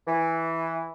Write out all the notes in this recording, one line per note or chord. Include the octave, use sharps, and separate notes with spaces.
E3